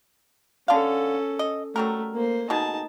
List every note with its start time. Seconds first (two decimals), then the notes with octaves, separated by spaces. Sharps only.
0.68 D3 C#4 A4 F5
1.39 D#5
1.76 F#3 G3 A3 A#4
2.14 A#3 C5
2.50 B2 D#4 G#4 A5